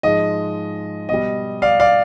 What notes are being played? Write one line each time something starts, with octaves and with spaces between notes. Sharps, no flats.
G#2 F3 G#3 D#5
B2 G3 D#5
D5 F5
D5 F5